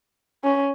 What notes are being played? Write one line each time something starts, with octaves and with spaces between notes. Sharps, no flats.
C#4